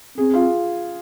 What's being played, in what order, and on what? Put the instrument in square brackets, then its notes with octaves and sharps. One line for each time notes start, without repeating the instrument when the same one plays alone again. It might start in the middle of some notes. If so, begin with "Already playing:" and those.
[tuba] C4 [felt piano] G#4
[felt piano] F4